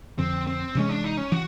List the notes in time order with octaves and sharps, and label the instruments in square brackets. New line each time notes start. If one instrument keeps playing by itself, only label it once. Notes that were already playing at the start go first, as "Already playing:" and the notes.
[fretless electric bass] F2 D3 F3 [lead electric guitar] C4
[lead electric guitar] C4
[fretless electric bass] C3 E3 G#3 [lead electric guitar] C#4
[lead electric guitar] D4
D#4
C#4
[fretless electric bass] E3 [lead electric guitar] F#4